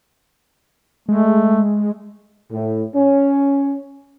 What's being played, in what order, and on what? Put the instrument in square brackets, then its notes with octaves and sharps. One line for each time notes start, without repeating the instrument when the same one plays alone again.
[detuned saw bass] G#3 [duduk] A3
[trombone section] A2
C#4